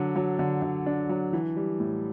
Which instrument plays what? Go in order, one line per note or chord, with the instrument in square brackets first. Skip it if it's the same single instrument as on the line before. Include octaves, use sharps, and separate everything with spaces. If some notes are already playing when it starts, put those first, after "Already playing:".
Already playing: [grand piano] D3 F#3 D4
F#3
D3
D3
D4
F#3
E3
G3
A2